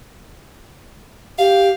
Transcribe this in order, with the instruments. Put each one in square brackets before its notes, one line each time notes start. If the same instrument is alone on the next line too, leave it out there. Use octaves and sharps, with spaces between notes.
[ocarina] G4 [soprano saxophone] F5